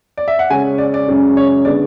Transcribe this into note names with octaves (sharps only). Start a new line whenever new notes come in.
D5
E5
F#5
C#3 G#3 C#4 G#5
D5
D5
F#2 C#3 G#3 C#4
C#5
D3 G#3 B3 D4 D5